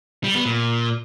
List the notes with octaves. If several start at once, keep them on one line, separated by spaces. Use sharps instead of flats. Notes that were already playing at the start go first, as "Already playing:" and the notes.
G3
B3
A#2